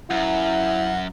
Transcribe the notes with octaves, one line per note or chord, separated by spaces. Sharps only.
F#2 E4 F#5